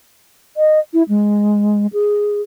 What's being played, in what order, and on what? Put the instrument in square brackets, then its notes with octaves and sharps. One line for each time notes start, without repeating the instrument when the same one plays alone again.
[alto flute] D#5
E4
G#3
G#4